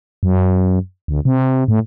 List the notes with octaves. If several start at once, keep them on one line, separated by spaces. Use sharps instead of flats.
F#2
D2
C3
A2